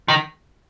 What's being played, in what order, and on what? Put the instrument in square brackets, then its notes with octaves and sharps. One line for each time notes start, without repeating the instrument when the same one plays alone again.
[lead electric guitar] D#3